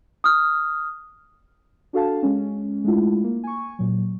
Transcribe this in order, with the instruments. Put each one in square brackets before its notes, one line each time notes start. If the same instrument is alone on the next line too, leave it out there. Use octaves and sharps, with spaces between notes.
[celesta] D#6 F6
[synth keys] D4 F#4 A4 F5 A5
G#3 C#4
G#3 A3 D4 E4 F4
A#3
G#5 C#6
A#2 F#3